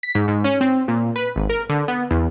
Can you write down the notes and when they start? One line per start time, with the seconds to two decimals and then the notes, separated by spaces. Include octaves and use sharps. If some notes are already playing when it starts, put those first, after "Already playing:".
0.03 B6
0.15 G#2
0.28 G#2
0.44 C#4
0.61 C4
0.88 A#2
1.16 B4
1.36 G#1
1.50 A#4
1.70 D3
1.88 B3
2.11 E2